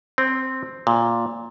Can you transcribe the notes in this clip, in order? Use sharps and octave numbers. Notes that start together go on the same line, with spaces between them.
C4
A#2